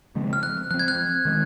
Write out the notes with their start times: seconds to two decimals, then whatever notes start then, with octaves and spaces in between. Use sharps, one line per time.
0.15 C#3 F3 G#3 C4
0.33 F6
0.43 F#6
0.71 F3 C4 F#6
0.79 G#6
0.88 F#6
1.25 D#3 G#3 C4